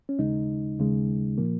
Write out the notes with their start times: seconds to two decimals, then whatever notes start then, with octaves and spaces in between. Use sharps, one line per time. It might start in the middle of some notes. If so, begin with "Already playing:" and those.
0.09 C#4
0.19 D#2 C#3 G#3 D#4
0.79 D#2 C#3 G#3
1.38 A#2 F3 A#3